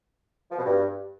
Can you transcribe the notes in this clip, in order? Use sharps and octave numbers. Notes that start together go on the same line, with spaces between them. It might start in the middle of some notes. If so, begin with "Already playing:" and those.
F3
B2
G2